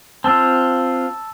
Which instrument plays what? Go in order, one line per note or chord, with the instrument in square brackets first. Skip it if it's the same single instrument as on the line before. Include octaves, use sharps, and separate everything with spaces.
[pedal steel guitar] C4 F4 [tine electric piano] A5 E6